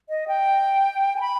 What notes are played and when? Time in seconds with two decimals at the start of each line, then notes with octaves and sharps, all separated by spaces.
0.09 D#5
0.28 G5
1.16 G#5
1.21 B5